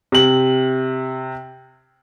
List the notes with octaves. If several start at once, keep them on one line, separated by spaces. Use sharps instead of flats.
C3 F#7